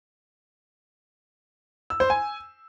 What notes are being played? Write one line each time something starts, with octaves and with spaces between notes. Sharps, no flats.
E6
C5
G#5